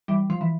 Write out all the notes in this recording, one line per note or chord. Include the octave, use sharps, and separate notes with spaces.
E3 G3
F3
E3